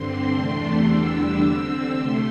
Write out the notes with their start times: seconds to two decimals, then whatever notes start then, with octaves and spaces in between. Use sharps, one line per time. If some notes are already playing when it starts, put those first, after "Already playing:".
Already playing: G2 D3 C4 C6
0.34 E2 C3 A3 D4
0.88 E2 D3 G3 D4 E6
1.42 D3 C4
1.97 C3 A3 C6